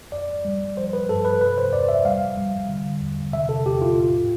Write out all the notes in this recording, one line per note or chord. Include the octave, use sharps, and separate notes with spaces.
F2 D5
G3
F3 C5
B4
G2 A4
B4
C3 B4
C5
E2 D5
E5
G3 F5
G3
D3
E2
C3 E5
A4
E2 G4
F4
A2